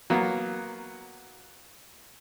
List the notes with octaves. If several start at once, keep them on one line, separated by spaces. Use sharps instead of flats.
F#3 A#3 B3